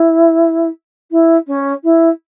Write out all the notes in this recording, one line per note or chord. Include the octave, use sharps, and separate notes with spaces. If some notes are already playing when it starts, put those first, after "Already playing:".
Already playing: E4
E4
C#4
E4